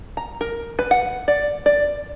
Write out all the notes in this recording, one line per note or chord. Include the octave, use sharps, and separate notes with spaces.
A#5
A#4
B4
F#5
D5
D5